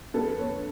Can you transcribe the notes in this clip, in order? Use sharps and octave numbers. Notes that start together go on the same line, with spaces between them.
F2 A4 B4
B4 C#5
D3